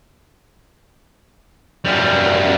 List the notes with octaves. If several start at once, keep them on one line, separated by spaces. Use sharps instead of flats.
F#2 G3